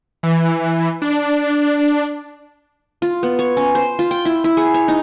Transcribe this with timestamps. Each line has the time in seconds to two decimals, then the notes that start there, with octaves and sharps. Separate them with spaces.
0.23 E3
1.02 D4
3.02 F4
3.23 B3
3.39 C#5
3.57 C#4
3.75 C5
3.99 F4
4.11 G5
4.25 E4
4.44 E4
4.57 G#4
4.74 C#5
4.88 D#4